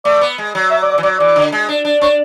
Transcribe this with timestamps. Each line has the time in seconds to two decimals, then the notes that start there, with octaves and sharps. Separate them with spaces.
0.05 A3 D5
0.21 B3
0.38 G#3
0.55 F#3
0.70 E5
0.82 D5
0.92 D5
0.98 E3
1.03 F#3 D5
1.19 E3 D5
1.36 D3
1.52 G#3
1.69 D4
1.85 D4
2.01 D4 C#5